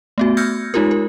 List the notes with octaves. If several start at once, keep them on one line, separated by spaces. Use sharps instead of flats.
A3 B3 F#4
E6 F6 G6 G#6 A#6 C#7
G#3 D#4 F4 G4 A#4
A#4